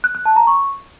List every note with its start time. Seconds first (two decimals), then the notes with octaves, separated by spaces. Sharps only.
0.04 F#6
0.15 F#6
0.26 A5
0.36 A#5
0.47 C#6